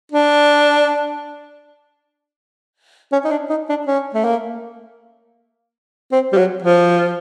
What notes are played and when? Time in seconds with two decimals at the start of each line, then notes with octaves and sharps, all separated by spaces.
0.12 D4
3.12 C#4
3.25 D#4
3.31 D4
3.50 D#4
3.69 D4
3.87 C#4
4.14 A3
4.24 A#3
6.12 C4
6.32 G3
6.37 F#3
6.62 F3